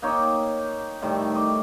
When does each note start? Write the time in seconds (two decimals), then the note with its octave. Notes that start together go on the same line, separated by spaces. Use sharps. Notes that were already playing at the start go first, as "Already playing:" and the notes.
0.02 A#3 D#4 C#5 G5
1.02 A2 D#3 G3 A3
1.35 D#5 D6